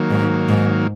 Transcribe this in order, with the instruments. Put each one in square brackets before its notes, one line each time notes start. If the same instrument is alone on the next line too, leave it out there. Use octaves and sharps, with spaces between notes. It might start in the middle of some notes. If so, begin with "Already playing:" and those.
Already playing: [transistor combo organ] D#3 F#3 A#3
[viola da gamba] G#2
G#2